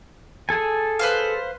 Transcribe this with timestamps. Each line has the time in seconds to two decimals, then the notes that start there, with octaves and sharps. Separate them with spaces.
0.49 G#4 A4 G#5
0.99 B4 C5 F5